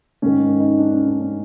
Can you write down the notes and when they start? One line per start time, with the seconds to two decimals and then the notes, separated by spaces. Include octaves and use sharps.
0.22 G#2 D#3 C#4
0.60 D#4
0.78 D4
0.93 C#4
1.06 D4
1.20 C#4